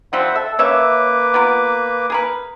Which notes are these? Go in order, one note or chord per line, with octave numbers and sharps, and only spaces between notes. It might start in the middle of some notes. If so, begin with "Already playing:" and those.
F3 G3 C4 C5 E5 F#5
A4 E5
A#3 C#4 B4 C#5 E5 D6
B3 F4 A#4
G#4 A#4 B4